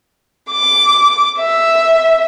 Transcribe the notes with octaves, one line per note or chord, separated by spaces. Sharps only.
D6
E5